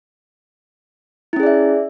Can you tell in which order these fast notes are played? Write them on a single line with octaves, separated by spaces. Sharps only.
E4 C#4 G#4 D5 E5